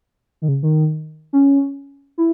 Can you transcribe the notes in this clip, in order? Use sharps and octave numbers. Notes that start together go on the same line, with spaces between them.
D#3
C#3
D#3
C#4
E4